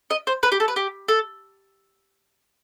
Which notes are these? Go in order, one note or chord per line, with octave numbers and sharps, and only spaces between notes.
D#5
C5
B4
G4
A4
B4
G4
A4